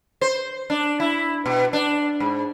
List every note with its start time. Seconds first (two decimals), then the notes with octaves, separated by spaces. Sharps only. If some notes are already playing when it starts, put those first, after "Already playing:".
0.21 C5
0.70 D4
1.00 E4
1.46 B2
1.73 D4
2.20 G#2